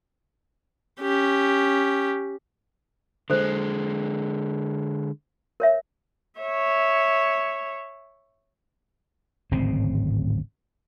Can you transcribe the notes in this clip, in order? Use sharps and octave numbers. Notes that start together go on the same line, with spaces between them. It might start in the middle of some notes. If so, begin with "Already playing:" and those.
C#4 G4
D3 G#3 A4 C5
A#4 C#5 E5
C#5 E5
D1 G#1 C#3 C4